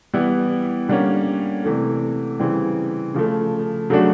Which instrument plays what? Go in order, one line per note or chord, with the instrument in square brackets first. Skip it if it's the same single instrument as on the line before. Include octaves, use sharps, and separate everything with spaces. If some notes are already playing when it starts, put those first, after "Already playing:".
[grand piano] E3 G3 B3 E4
D3 G3 A#3 C#4
C3 E3 A3
C#3 E3 G3 C4
C#3 F3 A3
C#3 F#3 A3 D4 F#4